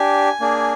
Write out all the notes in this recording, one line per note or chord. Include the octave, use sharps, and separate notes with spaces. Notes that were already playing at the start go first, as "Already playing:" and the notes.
Already playing: D4 G4 G#5
A#3 D4 G#4